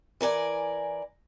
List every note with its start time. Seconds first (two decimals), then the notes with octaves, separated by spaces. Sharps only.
0.21 E3 A#4 D5 G#5